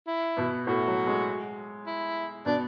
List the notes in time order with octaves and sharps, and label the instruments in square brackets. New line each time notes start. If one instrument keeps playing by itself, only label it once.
[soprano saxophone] E4
[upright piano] B2 B3
[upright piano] A2 A3 [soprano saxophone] F#4
[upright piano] F#3
G#3
[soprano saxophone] E4
[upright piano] B2 B3 [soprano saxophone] D4